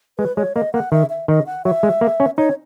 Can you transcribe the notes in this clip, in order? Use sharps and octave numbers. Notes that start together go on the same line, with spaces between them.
G#3 B4
G#3 C#5
A#3 D#5
A#3 F#5
D#3 E5
E5
D#3 D#5
F#5
F#3 E5
G#3
A#3
C#4
D#4 C#5